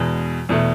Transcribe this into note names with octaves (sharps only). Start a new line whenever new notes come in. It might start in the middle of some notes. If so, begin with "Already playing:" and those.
Already playing: E2 B2 G#3
E2 B2 A3